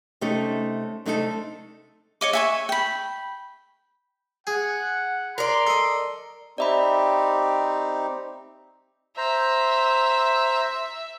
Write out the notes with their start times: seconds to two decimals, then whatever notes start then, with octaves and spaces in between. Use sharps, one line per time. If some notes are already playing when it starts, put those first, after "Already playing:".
0.21 C3 A3 C#4 D#4 A4
1.06 C3 A3 D4 D#4 G#4 A4
2.21 C#5 D#5 D6
2.33 E5 G#5 C#6
2.69 G5 B5
4.47 G#4 F#5
5.38 A#4 D5 C6
5.67 A4 D#5
6.58 C4 D#4 G4 D5 E5 B5
9.18 C5 E5 A#5